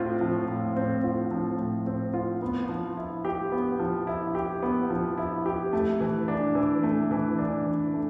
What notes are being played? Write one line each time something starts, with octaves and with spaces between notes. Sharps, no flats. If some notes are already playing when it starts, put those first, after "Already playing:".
Already playing: A2 C4 F4
F3
A2
C4
F4
F3
A2
C4
F4
B3
F3
E4
G4
B3
F3
E4
G4
B3
F3
E4
G4
A3
E3
D4
E3
A3
E3
D4
E3
A3